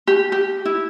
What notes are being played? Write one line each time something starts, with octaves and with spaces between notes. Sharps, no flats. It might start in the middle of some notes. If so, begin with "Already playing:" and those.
G4
G4
E4